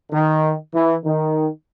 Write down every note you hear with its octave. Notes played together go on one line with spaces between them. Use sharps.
D#3
E3
D#3